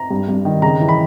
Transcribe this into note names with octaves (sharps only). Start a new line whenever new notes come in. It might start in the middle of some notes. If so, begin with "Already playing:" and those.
Already playing: A#5
G2
G2
D#3
C#3 A#5
E3
B5